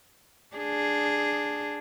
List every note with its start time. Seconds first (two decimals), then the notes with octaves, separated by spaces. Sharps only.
0.57 D4 G#4